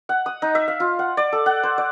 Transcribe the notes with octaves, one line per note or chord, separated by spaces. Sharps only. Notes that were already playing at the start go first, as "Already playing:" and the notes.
F#5
D#6
D#4
E5
F5
F4
F#5
D5
A4
F#5
C5
D5